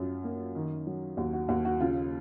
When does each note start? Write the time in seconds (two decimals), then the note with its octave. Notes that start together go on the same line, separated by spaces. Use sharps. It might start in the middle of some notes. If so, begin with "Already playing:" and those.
Already playing: F#2 F#3 F4
0.24 A#3
0.55 D#3
0.87 F#3
1.17 D#2 F#4
1.33 F#4
1.48 D#2 F#4
1.65 F#4
1.80 C#3 F4